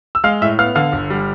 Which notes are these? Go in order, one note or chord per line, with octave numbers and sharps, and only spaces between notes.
E6
G#3 F5 F6
A2 E5 E6
B3 F5 F6
D3 F5 F6
G1
G3